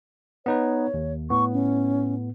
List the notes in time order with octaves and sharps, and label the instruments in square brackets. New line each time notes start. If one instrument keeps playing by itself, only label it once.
[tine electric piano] B3 D#4 B4 [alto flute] C#5
[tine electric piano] D#2
[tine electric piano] A2 B3 [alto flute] C#6
[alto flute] C#4